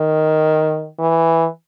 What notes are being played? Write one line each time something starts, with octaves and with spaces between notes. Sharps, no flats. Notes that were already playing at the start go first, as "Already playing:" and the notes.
Already playing: D#3
E3